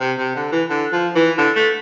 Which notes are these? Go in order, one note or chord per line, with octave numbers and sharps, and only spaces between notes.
C3
C3
D3
E3
D3
F3
E3
D3
A3